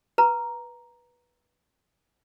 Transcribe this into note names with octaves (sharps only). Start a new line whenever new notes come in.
B4 A#5